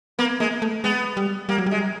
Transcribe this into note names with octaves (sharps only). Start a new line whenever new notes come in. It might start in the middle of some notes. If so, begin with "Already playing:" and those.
A#3 B3
G#3 A#3
A3
G#3 B3
G3
G3 A#3
F#3
G3 G#3